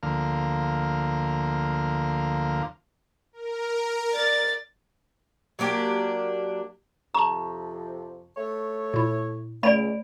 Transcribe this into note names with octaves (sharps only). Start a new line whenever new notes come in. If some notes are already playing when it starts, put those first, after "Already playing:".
D2 D3 F3 A#3 F5 A#5
A#4
D5 A6
F#3 A#3 D4 G4
F2 C3 F3 A5 A#5 C#6
A3 C#5
A#2 E4
C#2 A3 C#5 D5 G#5 B5 D7